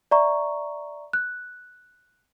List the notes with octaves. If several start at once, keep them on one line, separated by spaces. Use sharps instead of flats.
D5 E5 A#5 C#6
F#6